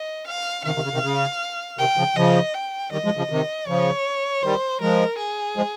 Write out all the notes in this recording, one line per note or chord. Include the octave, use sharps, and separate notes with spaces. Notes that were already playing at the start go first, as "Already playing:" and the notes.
Already playing: D#5
F5
C3 D#3 F5
C3 D#3
C#3
C3 D#3
C#3
C3 D#3 G5
C#3 F3
C#3 F3 D#5
G5
D#3 G3 D#5
F3 G#3
C#3 F3
C3 D#3
C#3 F3 C#5
D#3 G3 C5
F3 G#3 A#4
G#4
F3 G#3